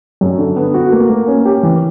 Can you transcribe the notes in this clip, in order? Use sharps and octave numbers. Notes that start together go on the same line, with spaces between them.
F#2
D3
B3
F#4
A#3
A#3
C#4
G4
E3